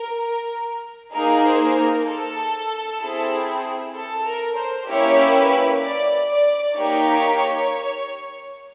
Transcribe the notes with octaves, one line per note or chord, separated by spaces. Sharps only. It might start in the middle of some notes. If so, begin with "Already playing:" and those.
Already playing: A#4
A#3 D#4 G#4 A#4
C5
A#4
A4
C4 E4 G#4
A4
A#4
C5
A#3 C#4 E4 G4 C#5
B4
D5
D5
A#3 D#4 G4 C#5